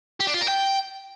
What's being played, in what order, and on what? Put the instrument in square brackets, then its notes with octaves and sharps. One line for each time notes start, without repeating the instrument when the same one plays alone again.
[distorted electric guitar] G4
D4
F4
A#4
G5